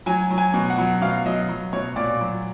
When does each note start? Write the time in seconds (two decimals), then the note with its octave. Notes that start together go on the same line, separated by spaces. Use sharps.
0.06 F#3 G#5
0.31 F#3
0.38 G#5
0.54 B2
0.70 F#5
0.78 F#3
1.01 B2 F5
1.25 F#3 D#5
1.48 F#3
1.73 B2 C#5
1.96 A#2 D5
2.21 F#3